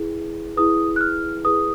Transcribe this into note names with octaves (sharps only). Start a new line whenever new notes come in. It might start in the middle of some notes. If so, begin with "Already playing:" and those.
Already playing: E4 G#4 B4
E4 G#4 B4 D#6
F#6
F6
E4 G#4 B4 D#6